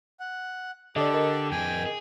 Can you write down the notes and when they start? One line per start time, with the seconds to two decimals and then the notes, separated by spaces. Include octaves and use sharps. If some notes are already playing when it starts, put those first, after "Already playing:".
0.20 F#5
0.96 D3 G4 A4 D5 D#5
1.14 A#4 D#5
1.51 F2 G#4 G5 G#5
1.86 G#4